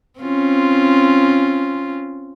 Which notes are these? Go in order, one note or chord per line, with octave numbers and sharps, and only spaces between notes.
C4 C#4 F4